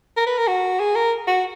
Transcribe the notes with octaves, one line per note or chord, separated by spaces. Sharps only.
A#4
B4
A#4
F#4
G#4
A#4
F#4